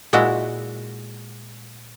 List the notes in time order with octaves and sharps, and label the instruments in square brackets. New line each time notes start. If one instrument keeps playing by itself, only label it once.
[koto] A#2 G#3 E4 F#4 F#5